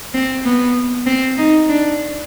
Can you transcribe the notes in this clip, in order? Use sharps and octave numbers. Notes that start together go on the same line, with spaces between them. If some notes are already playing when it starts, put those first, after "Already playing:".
C4
B3
C4
D#4
D4